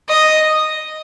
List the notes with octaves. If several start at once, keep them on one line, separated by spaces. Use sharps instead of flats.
D#5